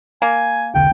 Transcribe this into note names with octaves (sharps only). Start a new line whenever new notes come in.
A#3 G#5
E1 C2 D3 G5